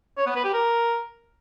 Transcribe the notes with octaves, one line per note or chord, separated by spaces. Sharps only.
C#5
B3
B4
G4
A#4